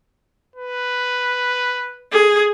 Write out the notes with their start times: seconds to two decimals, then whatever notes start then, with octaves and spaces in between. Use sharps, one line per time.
0.56 B4
2.12 G#4